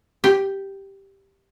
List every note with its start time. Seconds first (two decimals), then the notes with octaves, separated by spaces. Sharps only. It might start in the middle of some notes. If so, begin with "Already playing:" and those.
0.24 G4